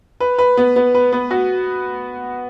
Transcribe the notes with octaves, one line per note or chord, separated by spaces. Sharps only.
B4
B4
B3
B3
B4
B3
F#4